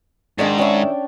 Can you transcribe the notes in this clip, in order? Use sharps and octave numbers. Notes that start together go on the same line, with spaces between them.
G#2 D#3 G#3 D4 D5 F5 G5
D#3 C#4 D4 E4 G5